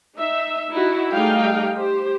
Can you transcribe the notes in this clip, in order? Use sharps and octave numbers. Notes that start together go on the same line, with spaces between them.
D#4 E5
D#4 E4 F#4
G3 A3 D#4 G#4 F5 G5
G4 C5